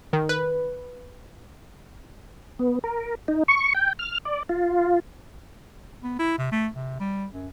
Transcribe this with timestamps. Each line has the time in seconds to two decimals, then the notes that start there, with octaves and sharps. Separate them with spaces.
0.13 D#3
0.29 B4
2.59 B3
2.84 A#4
3.28 D#4
3.48 C#6
3.75 G5
3.99 F6
4.25 D5
4.49 F4
6.03 B3
6.19 E4
6.38 C3
6.52 A3
6.75 C3
6.99 G3
7.33 F#2